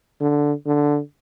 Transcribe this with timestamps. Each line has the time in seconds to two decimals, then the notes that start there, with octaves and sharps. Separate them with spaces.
0.21 D3
0.66 D3